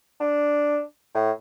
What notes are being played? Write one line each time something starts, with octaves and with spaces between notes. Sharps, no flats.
D4
A2